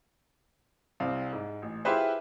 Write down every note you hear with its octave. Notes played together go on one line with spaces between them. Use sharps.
C2 C4 F5
G#2
A1
E4 F4 G4 G#4 B4 C5